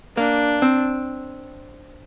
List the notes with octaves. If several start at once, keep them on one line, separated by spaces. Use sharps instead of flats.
A#3 D4
C4